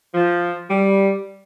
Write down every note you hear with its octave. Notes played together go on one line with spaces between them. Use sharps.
F3
G3